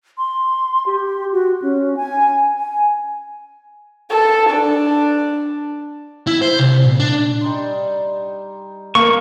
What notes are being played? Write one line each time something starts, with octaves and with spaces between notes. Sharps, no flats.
C6
G4
F#4
C#4
G#5
G#5
A4
D4
E4
C5
C2
A#2
D4
G3 D#4 C6
A#3 C#6